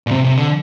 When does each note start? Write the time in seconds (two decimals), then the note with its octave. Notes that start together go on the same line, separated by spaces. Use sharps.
0.07 A#2
0.11 C3
0.24 C3
0.37 D3